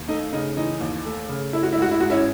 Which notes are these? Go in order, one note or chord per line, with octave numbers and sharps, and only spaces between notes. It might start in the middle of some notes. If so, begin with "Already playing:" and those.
Already playing: D#2
A3 D#4
C#3 D#4
E3 D#4
D#2
A3
C#3
A3 E4
F#4
E4
G#2 F#4
E4
G#2 F#4
C#4 E4